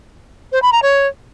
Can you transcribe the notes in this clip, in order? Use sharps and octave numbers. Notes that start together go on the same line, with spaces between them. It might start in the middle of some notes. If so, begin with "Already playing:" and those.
C5
B5
A#5
C#5